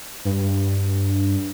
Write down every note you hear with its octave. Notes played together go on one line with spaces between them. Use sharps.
G2